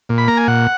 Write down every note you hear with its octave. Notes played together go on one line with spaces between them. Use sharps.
A#2
B5
A#3 A#5
G#5
A#2 F#5